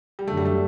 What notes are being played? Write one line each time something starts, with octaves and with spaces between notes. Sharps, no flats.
G3
F#2 D3 F#3 A3
G3
A3